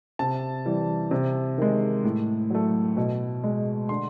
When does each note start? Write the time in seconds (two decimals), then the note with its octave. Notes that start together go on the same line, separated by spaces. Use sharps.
0.19 C3 A5
0.65 E3 G3
1.11 C3
1.58 D#3 G#3
2.04 A2
2.50 F#3 A3
2.97 B2
3.44 G#3
3.89 D3 C6